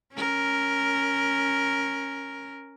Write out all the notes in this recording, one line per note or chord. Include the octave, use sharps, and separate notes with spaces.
C#4 A#4